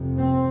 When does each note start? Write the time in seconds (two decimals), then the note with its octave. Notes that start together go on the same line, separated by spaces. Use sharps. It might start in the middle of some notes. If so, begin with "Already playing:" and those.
Already playing: F1 F2 C3
0.18 C4